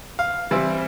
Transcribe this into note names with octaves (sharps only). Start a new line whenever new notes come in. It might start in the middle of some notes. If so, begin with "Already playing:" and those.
F5
E3 G3 C4 E4